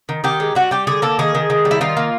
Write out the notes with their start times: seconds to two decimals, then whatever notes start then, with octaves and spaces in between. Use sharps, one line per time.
0.09 D#3
0.24 D#3 G4
0.40 G#3
0.55 G3 F#4
0.71 G3 G4
0.87 D3 G#4
1.02 A#3 A4
1.19 D#3 G#4
1.35 D#3
1.50 D#3
1.65 G3
1.71 E4
1.81 D#3 F4
1.97 A#3